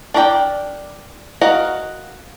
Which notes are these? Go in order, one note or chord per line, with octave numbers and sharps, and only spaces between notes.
D4 A#4 D5 D#5 G5
F#4 A#4 D#5 F5 F#5